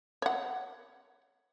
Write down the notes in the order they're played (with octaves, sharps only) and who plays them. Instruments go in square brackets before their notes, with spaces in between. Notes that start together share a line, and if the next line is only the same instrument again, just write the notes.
[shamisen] C#5 F#5